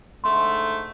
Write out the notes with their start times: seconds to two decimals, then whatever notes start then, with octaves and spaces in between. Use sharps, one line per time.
0.24 G#2 D3 A3 C6